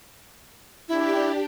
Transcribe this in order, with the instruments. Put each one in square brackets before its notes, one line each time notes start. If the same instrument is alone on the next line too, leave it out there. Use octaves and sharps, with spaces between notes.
[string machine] D4 G4 [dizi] E4